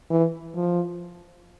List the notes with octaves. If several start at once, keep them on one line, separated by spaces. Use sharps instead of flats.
E3
F3